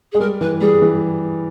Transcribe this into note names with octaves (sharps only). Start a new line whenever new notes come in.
G#3 G#4
G3 A#4
E3 B4
G3 G#4
E3